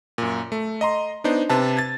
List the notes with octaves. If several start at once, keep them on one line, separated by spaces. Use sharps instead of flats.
F#2 A#2
A3
D#5 A#5 C6
B3 D4 D#4 C5
C3 B4 A5
G#6 A6